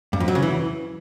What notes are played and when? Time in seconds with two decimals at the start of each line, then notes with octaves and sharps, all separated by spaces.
0.13 G2
0.20 F2
0.28 F#3
0.35 C#3
0.43 E3